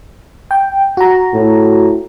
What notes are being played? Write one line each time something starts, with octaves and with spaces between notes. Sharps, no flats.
G5
F#4 A#5
A2